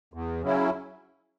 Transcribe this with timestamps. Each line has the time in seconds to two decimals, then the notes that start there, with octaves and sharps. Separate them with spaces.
0.14 E2
0.42 C#3 F#3 C#4 E4